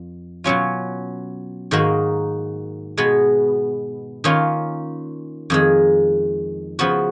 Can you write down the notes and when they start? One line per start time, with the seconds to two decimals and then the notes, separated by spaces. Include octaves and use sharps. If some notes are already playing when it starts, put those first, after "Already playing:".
Already playing: F2
0.44 B2 F#3 C#4 F4
1.71 G#2 D#3 A#3 D#4 F#4
2.97 B2 G#3 B3
4.24 D#3 A#3 C#4 F4
5.50 F2 D#3 G#3
6.79 C#3 F3 B3 F#4